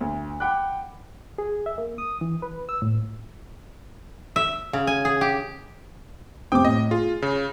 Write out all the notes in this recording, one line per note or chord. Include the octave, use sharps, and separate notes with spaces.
D2
F#5 G5 B5 D6 F#6
G#4
E5
A#3
D#6
E3
B4
E6
A2
E5
C#3
G#5
G#4
G4
F1 C4 G5 D6 D#6
A2 D#5
F4 G#4
C#3